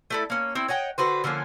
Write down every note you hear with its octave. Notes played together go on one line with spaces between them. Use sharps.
A3 E4 A4
A#3 C#4
C4 E4
C#5 D#5 F#5 G5
D3 F#4 B4 C5
D3 F3 A#3 C#4